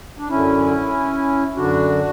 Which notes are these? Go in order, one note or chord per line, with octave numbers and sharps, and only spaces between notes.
D4
F#2 D3 C#4 E4
F#2 D3 D4 F#4